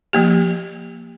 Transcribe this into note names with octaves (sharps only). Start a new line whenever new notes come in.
F3 A#3 G4